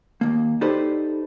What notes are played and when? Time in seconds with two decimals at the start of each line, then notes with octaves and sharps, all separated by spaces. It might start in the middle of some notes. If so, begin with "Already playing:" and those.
0.21 D#2 A#3
0.61 D#4 G4 A4 B4 C5 D5